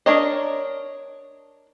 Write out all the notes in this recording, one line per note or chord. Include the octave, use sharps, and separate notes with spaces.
D4 A#4 C#5 D#5